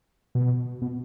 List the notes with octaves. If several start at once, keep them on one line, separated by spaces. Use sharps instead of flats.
B2
B2